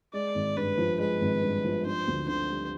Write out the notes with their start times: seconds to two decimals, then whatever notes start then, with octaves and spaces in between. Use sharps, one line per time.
0.13 G#3 D5
0.35 G#1
0.56 G2 B4
0.78 F3
0.99 G#3 B4
1.21 G#1
1.42 G2
1.64 F3
1.86 D4 C5
2.07 D2
2.28 D3 C5
2.50 G3